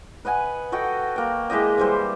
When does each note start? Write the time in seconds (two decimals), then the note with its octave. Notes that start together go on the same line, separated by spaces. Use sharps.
0.25 B4 D#5 F#5 G#5
0.72 F#4 A4 D#5 G5
1.16 A#3 G5
1.50 G#3 E4 G4 D#5
1.78 E3 G3 C5